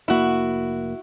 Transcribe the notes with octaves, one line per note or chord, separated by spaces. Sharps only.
F1 A#3 E4 F#4